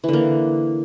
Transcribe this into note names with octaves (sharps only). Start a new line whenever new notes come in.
D3 E3 A#3